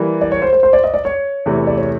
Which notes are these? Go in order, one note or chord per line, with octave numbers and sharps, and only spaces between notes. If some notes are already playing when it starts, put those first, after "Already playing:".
Already playing: E3 G3 A#3
D5
C#5
C5
C5
C5
D5
D#5
D5
C#5
E2 C3 E3 A3
D5
C#5